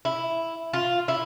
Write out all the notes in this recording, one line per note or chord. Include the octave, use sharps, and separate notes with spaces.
E4
F4
E4